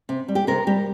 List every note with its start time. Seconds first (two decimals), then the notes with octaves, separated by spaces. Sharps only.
0.09 C3
0.28 G3
0.35 G4
0.47 C3 A#4
0.67 G3 G4